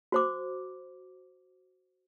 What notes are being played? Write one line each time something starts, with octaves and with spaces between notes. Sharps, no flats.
F#4 C5 D6